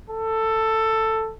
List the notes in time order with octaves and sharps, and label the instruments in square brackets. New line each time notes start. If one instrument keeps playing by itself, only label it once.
[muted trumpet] A4